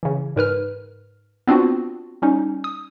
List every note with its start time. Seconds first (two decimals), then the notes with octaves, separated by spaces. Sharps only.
0.03 C#3 E3
0.36 G#2 A#4 B4 F6
1.47 B3 C4 D4 F4 F#4
2.22 G3 C#4 D#4
2.64 D#6